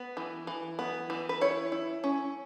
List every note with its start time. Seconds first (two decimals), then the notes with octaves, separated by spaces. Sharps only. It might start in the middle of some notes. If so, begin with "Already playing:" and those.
Already playing: B3
0.17 E3
0.47 E3
0.79 B3
1.10 E3
1.29 B4
1.41 E4 C#5
1.72 E4
2.04 C#4